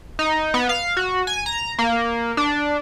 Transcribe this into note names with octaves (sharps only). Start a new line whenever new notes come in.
D#4
B3
F5
F#4
G#5
A#5
A#3
D4